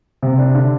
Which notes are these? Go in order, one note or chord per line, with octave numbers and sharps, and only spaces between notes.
C3
D4
D3